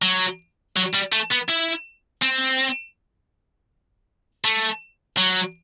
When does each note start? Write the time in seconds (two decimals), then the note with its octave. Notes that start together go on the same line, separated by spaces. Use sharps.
0.02 F#3
0.76 F#3
0.94 G3
1.12 A3
1.32 B3
1.50 E4
2.23 C4
4.45 A3
5.18 F#3